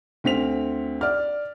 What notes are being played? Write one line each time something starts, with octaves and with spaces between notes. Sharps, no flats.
D2 C4 B6 F7
D5 F6